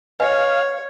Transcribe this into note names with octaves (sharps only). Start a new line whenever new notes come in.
B4 C#5 D#5 F5 G#5